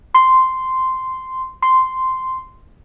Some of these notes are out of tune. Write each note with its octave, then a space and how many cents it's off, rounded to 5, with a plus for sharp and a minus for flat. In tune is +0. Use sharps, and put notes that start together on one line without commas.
C6 -10
C6 -10